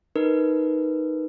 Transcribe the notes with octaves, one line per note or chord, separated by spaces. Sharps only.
D#4 A#4 B4